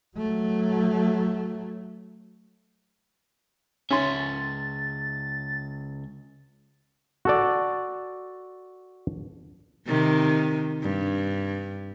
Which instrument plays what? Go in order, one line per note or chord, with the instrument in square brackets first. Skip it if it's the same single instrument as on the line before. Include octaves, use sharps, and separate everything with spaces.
[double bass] F#3 A3
[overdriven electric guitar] C#2 E5 [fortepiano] C#4 C6 [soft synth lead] A6
[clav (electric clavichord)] F#4 A4 D5
[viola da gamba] C3 D#3
G2